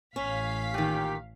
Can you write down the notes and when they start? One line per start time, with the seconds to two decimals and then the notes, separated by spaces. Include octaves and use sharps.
0.16 A1 C#4 F5 B6
0.74 A#2 D#3 G4